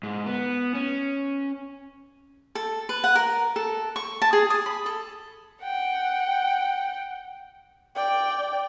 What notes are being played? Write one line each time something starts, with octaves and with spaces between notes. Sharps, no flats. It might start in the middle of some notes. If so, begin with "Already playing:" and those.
G#2
B3
C#4
A4
B4
F#5
A#4
A4
C#6
A5
G#4
D#6
B5
A4
F#5 G5
D5 G5